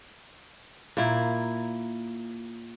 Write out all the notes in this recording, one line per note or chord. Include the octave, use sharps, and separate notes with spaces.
A#2 A#3 E4